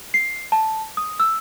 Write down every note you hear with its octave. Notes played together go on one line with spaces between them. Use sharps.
C7
A5
D#6
E6